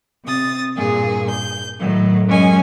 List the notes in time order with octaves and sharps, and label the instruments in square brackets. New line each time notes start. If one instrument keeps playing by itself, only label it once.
[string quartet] C3 D#6 A6
G2 A#2 G#4
G6
A2 D#3 F#3
F#2 F#3 G#3 C#4 D#5 G#5